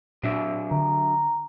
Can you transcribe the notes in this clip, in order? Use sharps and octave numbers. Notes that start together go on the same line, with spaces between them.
A#2 F#3 D4 E5
D3 A#5